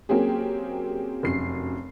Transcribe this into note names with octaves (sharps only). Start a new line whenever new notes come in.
F#3 A#3 C4 C#4 G4 G#4
F1 F#2 C7